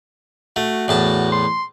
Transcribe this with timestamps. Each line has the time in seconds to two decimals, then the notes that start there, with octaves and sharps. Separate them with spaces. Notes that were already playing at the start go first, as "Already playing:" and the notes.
0.56 A3 F#4
0.88 E2 A2 A5
1.32 C6